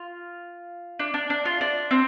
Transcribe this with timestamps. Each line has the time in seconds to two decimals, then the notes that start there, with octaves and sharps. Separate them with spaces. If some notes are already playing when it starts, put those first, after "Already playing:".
Already playing: F4
0.99 D4
1.14 D4
1.30 D4
1.45 F4
1.61 D4
1.91 C4